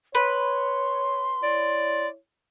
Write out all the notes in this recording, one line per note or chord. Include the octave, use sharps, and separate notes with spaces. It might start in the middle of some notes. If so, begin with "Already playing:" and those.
B4 C#5 C6
E4 C#5 D5